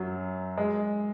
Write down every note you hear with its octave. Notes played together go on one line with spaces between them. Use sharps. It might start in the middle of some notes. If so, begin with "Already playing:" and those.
Already playing: F#2 F#3
G#3